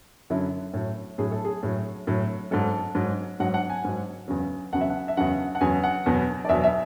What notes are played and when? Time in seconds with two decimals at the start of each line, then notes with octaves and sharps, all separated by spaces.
0.30 F#2 D3 F#3 E4
0.74 A2 F#3
1.18 A2 F#3 G#4
1.32 A4
1.45 G#4
1.63 A2 F#3
2.07 A2 F#3
2.51 G#2 F#3 A4
2.95 G#2 F#3
3.40 G#2 F#3 F#5
3.54 F#5
3.70 G#5
3.85 G#2 F#3
4.28 E2 C#3 F#3
4.73 E2 C#3 F#3 F#5
4.81 E5
4.90 F#5
5.08 E5
5.17 E2 C#3 F#3 F#5
5.55 F#5
5.61 E2 C#3 F#3 G#5
5.84 F#5
6.06 E2 B2 F#3
6.45 D5
6.49 E2 B2 F#3 E5
6.64 E5